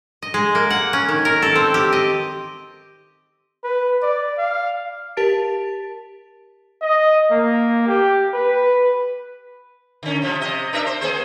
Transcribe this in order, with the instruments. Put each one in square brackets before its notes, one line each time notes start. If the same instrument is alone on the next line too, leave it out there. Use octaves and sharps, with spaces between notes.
[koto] D#5
G#3
A#3
F#5
C#4
D#3
A#4
A4
C4
G4
D#5
[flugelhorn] B4
D5
F5
[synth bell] G4 A#4 A5 A6 D7
[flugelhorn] D#5
A#3
G4
B4
[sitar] D3 C#4
C3 F3
C3 D#5
D4 A#4 E5
C5
A#3 G#4 C5